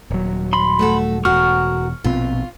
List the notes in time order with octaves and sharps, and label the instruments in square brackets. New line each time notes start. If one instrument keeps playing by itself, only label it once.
[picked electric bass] D#1 F#3
[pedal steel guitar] B5 C6
[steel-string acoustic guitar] A3 F#4 A4
[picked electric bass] E1 [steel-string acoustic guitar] F#4 A#4 [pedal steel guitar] C#6 F6
[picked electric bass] A#1 B2 C4 [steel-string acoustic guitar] F4